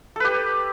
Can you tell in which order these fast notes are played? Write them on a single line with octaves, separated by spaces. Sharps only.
A4 B4 G4